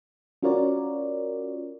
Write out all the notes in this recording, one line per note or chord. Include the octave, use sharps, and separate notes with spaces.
C#4 F4 F#4 A#4 C#5 D5